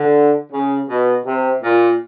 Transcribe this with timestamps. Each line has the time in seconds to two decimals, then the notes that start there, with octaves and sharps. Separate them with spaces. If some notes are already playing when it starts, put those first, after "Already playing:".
Already playing: D3
0.52 C#3
0.89 B2
1.26 C3
1.63 A#2